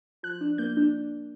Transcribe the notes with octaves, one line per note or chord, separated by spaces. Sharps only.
F3 F#6
D4
A#3 G6
D4